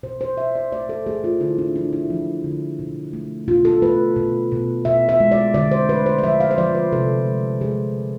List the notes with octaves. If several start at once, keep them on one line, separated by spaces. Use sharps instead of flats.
B2 C5
C5
B2 E5
D5
A3 D5
A4
A3 G#4
F4
D3 E4
D4
F3 D4
E4
F3
D3
B2
A3
B2 F4
A4
A3 B4
B2
B2
B2 E5
E5
G#3
D5
D3 D5
C5
A3 B4
C5
D5
F3 E5
F5
C5
F3 D5
B4
C3 A4
G#3
G#3 G#4
G#3